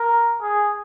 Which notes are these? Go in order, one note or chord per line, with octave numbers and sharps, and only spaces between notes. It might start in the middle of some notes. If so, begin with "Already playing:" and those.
Already playing: A#4
G#4